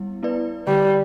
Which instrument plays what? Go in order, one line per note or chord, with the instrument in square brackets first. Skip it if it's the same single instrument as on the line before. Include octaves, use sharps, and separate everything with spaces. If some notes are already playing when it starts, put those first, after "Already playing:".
Already playing: [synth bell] G3 B3 E4
B3 E4 B4 D5
[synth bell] D3 [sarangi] G3